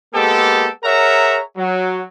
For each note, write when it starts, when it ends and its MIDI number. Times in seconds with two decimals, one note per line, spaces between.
0.14 0.67 56
0.14 0.67 58
0.14 0.67 59
0.14 0.67 67
0.14 0.67 69
0.84 1.38 68
0.84 1.38 70
0.84 1.38 73
0.84 1.38 76
0.84 1.38 78
0.84 1.38 82
1.56 2.01 54